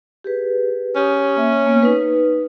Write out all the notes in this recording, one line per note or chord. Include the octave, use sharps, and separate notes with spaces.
G4 G#4 B4
C#4 G4 D#6
A#3 E5
A#3 B3
D#4 B4